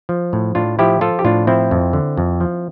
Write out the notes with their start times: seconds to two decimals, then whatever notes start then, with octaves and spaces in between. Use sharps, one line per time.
0.09 F3
0.33 A2
0.55 A2 D4 F4
0.79 F3 E4 G4
1.01 F3 F4 A4
1.19 G4
1.25 A2 D4 F4
1.47 F3 C4 E4
1.71 F2
1.93 D3
2.17 F2
2.40 F3